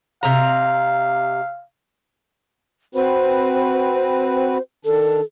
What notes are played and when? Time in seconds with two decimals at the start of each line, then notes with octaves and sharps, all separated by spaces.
0.23 C3 F5 A#5
2.95 C4 F#4 B4 C5
4.85 D#3 D4 A4